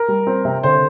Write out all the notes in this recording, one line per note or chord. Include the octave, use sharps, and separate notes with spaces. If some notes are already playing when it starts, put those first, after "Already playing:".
Already playing: A#4
G3
C4
C3
D3 C5